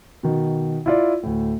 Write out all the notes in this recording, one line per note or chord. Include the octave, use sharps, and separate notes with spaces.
B2 D#3
E4 F4 D5
D2 A2